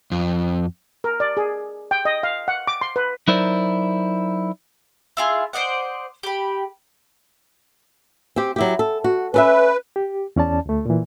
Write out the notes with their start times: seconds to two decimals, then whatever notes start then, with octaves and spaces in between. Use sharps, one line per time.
0.12 F2
1.04 A#4
1.20 D5
1.37 G#4
1.91 G5
2.05 D#5
2.23 F5
2.48 F#5
2.67 D6
2.81 C6
2.96 B4
3.28 F#3 D#4 E4 A#4 C5 D5
5.17 E4 F4 G#4
5.53 C5 D5 D#5 F#5
6.23 G4 B5
8.36 C4 G4
8.56 F#3 E4 G4
8.79 A4
9.04 F#4
9.34 C#4 A4 B4 E5
9.96 G4
10.36 E2 C#4 D5 A5
10.66 D2 A3
10.86 A#2 E3